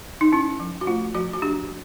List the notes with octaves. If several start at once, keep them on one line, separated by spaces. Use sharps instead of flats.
D#4
C#4 E4
F3
F#4
A3 F4
F3 F#4
F#4
D4 G4